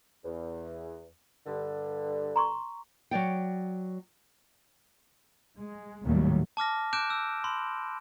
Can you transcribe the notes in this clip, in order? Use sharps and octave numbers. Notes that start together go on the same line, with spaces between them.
E2
G2 D3
A#5 C6 C#6
F#3 C#5 D5 G5
G#3
G#1 D#2 A2 F#3 G3
A5 D6 F6 A#6
D6 F#6 G6 D7 E7
E6
B5 C6